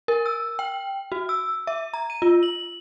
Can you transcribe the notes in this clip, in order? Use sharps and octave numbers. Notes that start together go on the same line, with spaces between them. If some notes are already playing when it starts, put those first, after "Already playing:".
A#4
E6
G5
F#4
E6
E5
A#5
D#7
F4
F#7